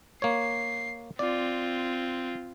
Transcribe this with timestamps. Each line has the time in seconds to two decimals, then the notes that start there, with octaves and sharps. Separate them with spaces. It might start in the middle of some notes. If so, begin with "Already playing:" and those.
0.22 A#3 C#5 C7
1.19 C4 F4 D5